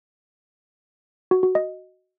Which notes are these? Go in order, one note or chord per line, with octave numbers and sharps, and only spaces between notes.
F#4
F#4
D#5